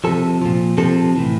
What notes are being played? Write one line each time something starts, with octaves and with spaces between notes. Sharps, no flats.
C3 F3 A4
A#2 F3
C3 F3 A4
A2 E3